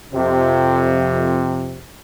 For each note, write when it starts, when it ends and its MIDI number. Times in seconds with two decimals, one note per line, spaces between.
0.14 1.79 41
0.14 1.79 48